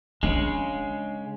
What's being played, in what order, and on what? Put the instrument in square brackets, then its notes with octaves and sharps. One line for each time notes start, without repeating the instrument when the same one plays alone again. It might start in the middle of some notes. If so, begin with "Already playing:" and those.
[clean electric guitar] C#3 G#3 [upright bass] D4